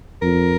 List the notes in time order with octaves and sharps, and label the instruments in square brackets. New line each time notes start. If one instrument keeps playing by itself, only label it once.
[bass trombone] F2 [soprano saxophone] A#4